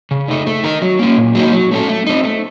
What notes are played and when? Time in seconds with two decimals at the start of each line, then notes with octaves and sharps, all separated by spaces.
0.11 C#3
0.28 A3 D#4
0.47 A3
0.64 D#4 A#4
0.82 F#3
0.99 A#3 C#4
1.17 A#2
1.35 F#3 A#3 D#4
1.53 F#3
1.71 A3 C#4 A4
1.89 A3
2.07 C4 D#4
2.24 A3